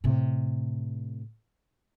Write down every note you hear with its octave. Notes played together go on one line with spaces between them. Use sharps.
A2 C3